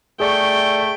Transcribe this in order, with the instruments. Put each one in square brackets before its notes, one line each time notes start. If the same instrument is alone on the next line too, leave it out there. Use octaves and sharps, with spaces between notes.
[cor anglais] A3 [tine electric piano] G#4 D5 C#6 [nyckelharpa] G5